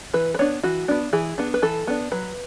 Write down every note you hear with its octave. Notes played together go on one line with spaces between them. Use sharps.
E3 B4
B4
B3 D4 C#5
E3 F#4
B3 D4
E3 G#4
B3 D4
B4
E3 A4
B3 D4
F#3 B4